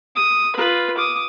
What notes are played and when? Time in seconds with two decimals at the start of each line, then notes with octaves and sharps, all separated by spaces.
0.16 D#6
0.56 F4 B4
0.98 D6 D#6